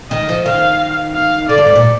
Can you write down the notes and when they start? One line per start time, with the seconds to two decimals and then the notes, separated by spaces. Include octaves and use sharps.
0.11 D#3 D#5
0.29 F3
0.46 D#3 F5
1.15 F5
1.49 D3 D5
1.58 G2
1.67 G#2
1.75 A#2